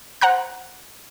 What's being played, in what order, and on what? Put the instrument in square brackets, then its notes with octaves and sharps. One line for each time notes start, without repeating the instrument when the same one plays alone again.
[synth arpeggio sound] C5 F#5 A#5 F#6